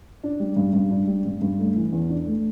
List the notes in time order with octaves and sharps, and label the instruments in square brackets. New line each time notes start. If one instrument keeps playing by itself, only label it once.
[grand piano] D4
G3
G2
G2
D4
G3
G2
G2
A3
E3
E2
D4
A3